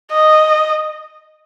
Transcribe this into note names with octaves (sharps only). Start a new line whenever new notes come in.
D#5